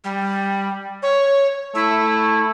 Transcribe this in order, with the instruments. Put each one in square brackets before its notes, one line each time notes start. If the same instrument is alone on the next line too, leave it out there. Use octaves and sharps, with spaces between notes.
[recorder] G3
C#5
[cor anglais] A3 [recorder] E4